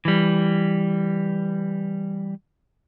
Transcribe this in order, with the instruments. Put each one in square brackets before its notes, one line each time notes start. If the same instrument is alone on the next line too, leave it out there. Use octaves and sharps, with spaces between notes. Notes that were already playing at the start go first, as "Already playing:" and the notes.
[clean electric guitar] E3 G3